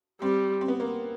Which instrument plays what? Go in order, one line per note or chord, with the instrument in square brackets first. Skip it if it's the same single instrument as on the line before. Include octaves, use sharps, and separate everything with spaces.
[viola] G3 [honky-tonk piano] C4
[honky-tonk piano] C4
B3
A#3